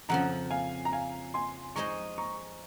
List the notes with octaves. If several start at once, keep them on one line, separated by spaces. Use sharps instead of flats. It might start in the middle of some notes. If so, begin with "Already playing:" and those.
F2 C#3 F3 F#5 A#5
F5 G#5
A#5
F5 G#5
G#5 C6
G#3 D#4 G#4 C5 D#5 A#5 C#6
A#5 C#6